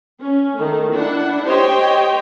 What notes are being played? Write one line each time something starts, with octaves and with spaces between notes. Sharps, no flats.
C#4
D#3 A3
D4 E4 F#5
G4 C5 C#5 D#5 G5